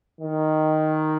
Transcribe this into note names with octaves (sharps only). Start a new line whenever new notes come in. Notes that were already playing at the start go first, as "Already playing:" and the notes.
D#3